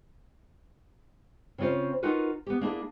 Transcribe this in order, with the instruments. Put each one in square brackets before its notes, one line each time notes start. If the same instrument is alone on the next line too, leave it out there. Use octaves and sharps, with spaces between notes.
[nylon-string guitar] C#3 C4 C#4 F4 C5
D#4 F4 F#4 A#4 B4
B3 G4
A#3 D4 E4 G#4